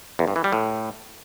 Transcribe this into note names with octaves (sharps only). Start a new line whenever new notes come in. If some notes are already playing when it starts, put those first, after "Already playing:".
E2
G2
E3
G3
A2